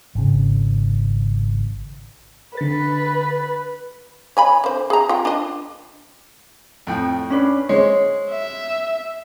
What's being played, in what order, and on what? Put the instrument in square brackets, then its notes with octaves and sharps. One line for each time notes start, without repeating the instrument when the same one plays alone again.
[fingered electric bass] G#1 C#3
[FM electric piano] D3 A6 [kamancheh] B4
[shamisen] C#5 G#5 B5
D3 C5
G#4 A#5
F4 G5
D4 D#5
[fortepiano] F2 A2 G5
[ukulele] C#4 D4 B4
[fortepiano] G#3 [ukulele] C5 C#5
[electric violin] E5